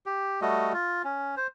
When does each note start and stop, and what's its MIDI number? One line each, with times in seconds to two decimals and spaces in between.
0.06 0.40 67
0.42 0.73 55
0.42 0.73 57
0.42 0.73 66
0.42 0.73 75
0.74 1.02 65
1.04 1.35 61
1.37 1.47 72